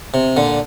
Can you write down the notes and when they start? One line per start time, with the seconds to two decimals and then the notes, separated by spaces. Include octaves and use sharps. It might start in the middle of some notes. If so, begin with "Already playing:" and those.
0.14 C3
0.37 A#2 D3